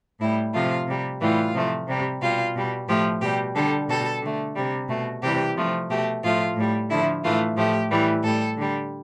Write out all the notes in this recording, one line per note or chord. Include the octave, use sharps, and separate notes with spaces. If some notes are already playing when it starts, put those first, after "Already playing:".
A2 G3 E4
C3 F3 A3 F4
C3 G3
A2 E3 G3 F4
C3 F3 A3
C3 G3
B2 G3 F4
B2 G3
A2 F3 A3 G4
B2 G3 G4
D3 G3 A4
B2 G3 A4
D3 A3
C3 G3
B2 A3
C3 E3 G3 G4
C3 F3 A3
B2 A3 G4
A2 F3 A3 F4
A2 G3
D3 F3 A3 E4
A2 E3 A3 F4
A2 F3 A3 G4
A2 E3 G3
A2 G3 A4
D3 G3